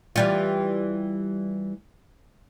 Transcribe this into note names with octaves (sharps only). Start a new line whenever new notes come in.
E3 G3 F4